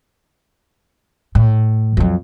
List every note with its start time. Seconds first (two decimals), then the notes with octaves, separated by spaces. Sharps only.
1.35 A2
1.97 F2 F#3